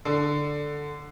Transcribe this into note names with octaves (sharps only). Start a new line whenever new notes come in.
D3